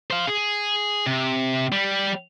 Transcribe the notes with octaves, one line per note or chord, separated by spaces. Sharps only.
C5 F5
G#4
C3
G3